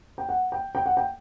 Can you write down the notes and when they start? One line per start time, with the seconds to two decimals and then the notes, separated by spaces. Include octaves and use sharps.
0.18 G5
0.29 F#5
0.52 G5
0.75 G5
0.86 F#5
0.97 G5